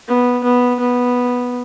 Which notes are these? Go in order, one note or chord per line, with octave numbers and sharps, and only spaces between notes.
B3
B3
B3